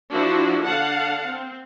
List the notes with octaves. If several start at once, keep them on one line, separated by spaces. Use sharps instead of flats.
F3 D4 E4 F#4
D3 F5 F#5 A5
C4